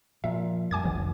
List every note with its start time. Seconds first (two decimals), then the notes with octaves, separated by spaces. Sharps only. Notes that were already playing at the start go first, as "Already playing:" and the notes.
0.24 A#2 F3 E5 F5
0.71 F#2 G3 G#5 D6 G#6
0.84 F1 B1 D3 E3